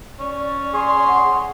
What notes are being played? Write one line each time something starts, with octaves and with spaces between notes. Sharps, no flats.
C#4 D5
G#4 C6
F#5